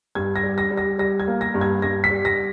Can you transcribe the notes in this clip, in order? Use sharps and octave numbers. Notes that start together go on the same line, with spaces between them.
G2 G#6
A#6
G3
A#6
G3
A#6
G3 A#6
G#6
A#3
A#6
G2
G#6
G2 A#6
B6
G3
A#6